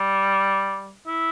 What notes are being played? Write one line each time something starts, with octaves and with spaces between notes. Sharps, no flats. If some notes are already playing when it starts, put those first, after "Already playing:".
Already playing: G3
E4